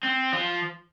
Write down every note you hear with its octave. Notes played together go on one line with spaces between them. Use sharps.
C4
F3